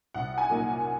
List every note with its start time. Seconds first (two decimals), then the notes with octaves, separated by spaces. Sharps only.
0.14 C2 F#5
0.38 G#5
0.50 A#2 F#3 A#3 D#4